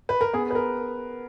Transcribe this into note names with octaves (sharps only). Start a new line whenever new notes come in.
B4
A#4
B3 G#4
B4
A#4